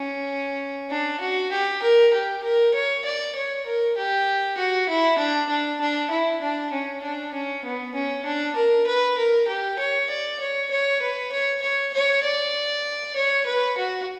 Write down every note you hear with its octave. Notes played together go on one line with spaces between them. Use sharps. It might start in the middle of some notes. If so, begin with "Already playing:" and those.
Already playing: C#4
D4
F#4
G4
A#4
G4
A#4
C#5
D5
C#5
A#4
G4
F#4
E4
D4
D4
D4
E4
D4
C#4
D4
C#4
B3
C#4
D4
A#4
B4
A#4
G4
C#5
D5
C#5
C#5
B4
C#5
C#5
C#5
D5
C#5
B4
F#4